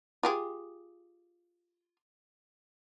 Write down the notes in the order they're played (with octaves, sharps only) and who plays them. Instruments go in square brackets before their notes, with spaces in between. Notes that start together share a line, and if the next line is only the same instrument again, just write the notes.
[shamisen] F4 G4 G#4